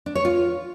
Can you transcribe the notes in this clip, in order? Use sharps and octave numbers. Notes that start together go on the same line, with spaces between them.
D4
C#5
F4